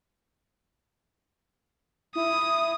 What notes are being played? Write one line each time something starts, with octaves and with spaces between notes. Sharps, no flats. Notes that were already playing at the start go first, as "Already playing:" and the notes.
E4 D#6